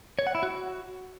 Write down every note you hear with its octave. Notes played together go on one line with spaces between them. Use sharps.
C#5
F#5
E4
F#4